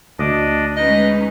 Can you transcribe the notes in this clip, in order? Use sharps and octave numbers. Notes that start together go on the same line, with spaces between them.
D2 D4 D5 D#5
G#3 C#4 D#4 B4 D#5